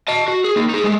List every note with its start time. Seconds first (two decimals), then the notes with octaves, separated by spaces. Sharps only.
0.08 D#5 A5
0.28 F#4
0.44 G#4
0.56 A#3 D#4
0.69 D#4 G#4
0.84 G#3 A3